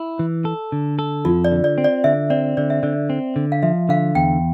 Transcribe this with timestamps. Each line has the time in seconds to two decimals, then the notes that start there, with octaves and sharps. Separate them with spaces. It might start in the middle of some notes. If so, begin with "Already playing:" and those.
Already playing: E4
0.19 E3
0.45 A4
0.72 D3
0.99 A4
1.25 F2 F4
1.45 D5
1.51 D3
1.64 D5
1.78 C4
1.84 D5
2.04 D3 E5
2.30 C4 D5
2.57 D3 D5
2.70 E5
2.83 D3 D5
3.10 C4
3.36 D3
3.52 F5
3.63 F3 E5
3.89 D3 F5
4.15 E2 G5